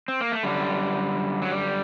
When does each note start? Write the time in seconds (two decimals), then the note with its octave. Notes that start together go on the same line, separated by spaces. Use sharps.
0.08 C4
0.21 A#3
0.32 A3
0.43 F#2 D3 G3
1.42 F#3
1.51 G3